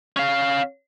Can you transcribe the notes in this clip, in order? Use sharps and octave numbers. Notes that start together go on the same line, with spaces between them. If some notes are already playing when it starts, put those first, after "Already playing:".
C#4 F5